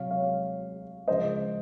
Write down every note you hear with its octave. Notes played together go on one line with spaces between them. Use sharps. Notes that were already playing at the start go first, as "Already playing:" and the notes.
Already playing: C3 F#3 C#5 F5
C#5 F5
C#3 F3 G#3 C5 D#5